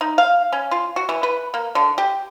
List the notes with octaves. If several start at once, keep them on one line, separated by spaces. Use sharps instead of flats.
D#4
F5
C#4
F4
F#4
E3
B4
A#3
D3
G4